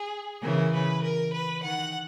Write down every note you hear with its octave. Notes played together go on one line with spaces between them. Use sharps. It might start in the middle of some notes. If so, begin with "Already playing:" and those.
Already playing: G#4
C#3 E3 A#4
B4
A#4
B4
D#3 F#5